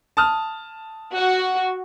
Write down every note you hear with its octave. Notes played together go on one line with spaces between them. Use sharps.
A5 D#6 F6
F#4